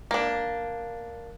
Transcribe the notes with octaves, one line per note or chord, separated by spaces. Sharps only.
A#3 D4